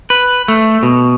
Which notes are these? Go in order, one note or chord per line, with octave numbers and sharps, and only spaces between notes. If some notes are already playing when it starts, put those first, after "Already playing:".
B4
A3
B2